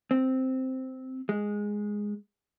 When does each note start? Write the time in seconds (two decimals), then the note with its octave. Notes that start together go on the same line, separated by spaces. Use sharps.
0.11 C4
1.29 G#3